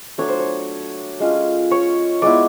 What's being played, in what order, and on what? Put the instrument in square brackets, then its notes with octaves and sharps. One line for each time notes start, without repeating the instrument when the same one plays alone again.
[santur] F#3 A3 D4 C#5
C5
C#5
G#3 C#4 F4
C#5
G#3 B3 E4 D5